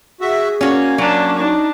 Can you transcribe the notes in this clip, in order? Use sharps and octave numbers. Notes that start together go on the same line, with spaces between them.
F#4 G#4 E5
A#3 C#4 F#4
F#3 C#4 D4 D5
D4 D#4